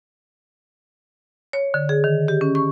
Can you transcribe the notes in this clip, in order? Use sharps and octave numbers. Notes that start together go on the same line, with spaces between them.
C#5
D3
G#4
D#3
G4
C#4
C#6